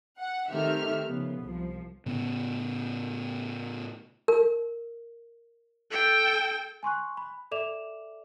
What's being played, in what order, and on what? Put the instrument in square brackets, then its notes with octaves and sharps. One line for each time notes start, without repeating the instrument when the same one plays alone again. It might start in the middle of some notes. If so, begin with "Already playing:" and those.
[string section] F#5
D#3 A3 C4 G4 E5 F6
C#3 F3 B3
C2 F3
[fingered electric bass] A2 C#3 B3
[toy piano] A#4
[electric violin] A4 G5
[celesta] G#5 C6 C#6 F#6
B5
A4 D5 E5 D6 E7 F7